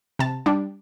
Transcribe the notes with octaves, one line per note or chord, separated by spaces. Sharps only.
C3 A5
G3 D4